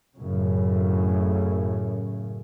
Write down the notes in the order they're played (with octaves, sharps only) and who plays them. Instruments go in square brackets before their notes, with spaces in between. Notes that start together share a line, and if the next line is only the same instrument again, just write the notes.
[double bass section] F#2 A2 C#3